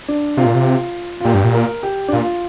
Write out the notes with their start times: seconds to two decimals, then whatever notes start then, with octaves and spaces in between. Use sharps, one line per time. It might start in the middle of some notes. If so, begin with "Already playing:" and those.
0.08 D4
0.37 C3 F4
0.46 A#2
0.55 C3
1.20 F4
1.24 A#2 G4
1.34 G2
1.44 A#2
1.54 A#4
1.83 G4
2.08 D4
2.12 A#2 F4